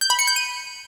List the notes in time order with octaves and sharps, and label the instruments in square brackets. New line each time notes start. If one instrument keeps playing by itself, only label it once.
[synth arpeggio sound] G6
B5
C#7
G6
D#7